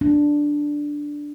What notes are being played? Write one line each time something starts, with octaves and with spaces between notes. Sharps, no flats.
D4